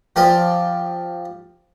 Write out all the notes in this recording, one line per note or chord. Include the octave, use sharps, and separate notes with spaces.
F3 C4 G4 D5 G#5